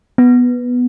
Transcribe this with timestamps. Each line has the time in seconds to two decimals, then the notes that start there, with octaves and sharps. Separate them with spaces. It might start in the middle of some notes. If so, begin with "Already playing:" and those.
0.18 B3